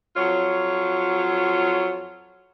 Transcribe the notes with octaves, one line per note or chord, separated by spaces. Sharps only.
F2 F#3 F4 C#5